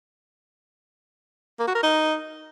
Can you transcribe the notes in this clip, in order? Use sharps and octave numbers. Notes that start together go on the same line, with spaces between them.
A#3
F#4
A#4
D#4